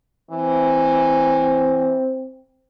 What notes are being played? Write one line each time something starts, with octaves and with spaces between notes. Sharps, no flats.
E3 C4